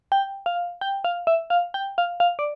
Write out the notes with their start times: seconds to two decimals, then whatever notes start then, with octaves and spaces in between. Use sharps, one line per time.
0.12 G5
0.46 F5
0.81 G5
1.04 F5
1.27 E5
1.50 F5
1.74 G5
1.98 F5
2.20 F5
2.39 D5